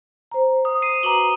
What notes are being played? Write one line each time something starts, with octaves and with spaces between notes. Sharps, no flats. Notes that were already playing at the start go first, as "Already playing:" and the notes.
C5 A#5
D#6
C7 D#7
F#4 B4 A#5 D6 F#7 G7